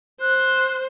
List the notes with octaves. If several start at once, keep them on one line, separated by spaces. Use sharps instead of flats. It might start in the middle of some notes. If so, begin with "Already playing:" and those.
C5 F#6